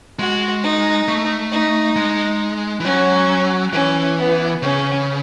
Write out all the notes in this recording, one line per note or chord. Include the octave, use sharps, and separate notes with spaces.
G#3 F#4
D#4
A3
D#4
G#3
E3
F#3 C#4
E3 C#4
B3
C#3 C#4